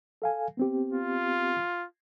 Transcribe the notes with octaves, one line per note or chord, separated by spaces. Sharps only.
A4 F5 G#5
B3 C4 G4
F4